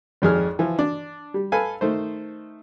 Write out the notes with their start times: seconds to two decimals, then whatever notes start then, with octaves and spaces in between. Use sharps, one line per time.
0.22 G#1 F2 G#4 F6
0.59 E3 F3
0.79 D4
1.34 G3
1.52 A4 B4 F5 G#5
1.81 D#3 A3 C5